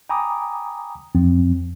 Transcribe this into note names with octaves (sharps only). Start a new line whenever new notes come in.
G5 G#5 A#5 B5 D6 D#6
F2 F3 C4